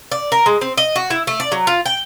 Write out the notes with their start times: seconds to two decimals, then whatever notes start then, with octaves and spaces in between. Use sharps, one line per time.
0.11 D5
0.32 A#4
0.46 G#3
0.61 C4
0.77 D#5
0.96 F#4
1.10 E4
1.27 A3
1.40 D5
1.52 F#3
1.67 F4
1.86 G5